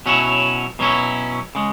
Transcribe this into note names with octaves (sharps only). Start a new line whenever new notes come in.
B2 F#3 C#4 E4
B2 F#3 C#4 E4
C#3 G#3